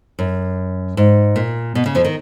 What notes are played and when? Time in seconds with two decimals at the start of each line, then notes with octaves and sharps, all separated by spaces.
0.19 F#2
0.97 G#2
1.36 A#2
1.75 B2
1.86 C#3
1.95 F2 F3
2.05 D#3